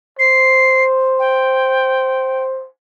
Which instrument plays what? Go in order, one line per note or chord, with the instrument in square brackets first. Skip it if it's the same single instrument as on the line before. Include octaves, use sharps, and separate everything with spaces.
[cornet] C5 [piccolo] C7
[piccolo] G5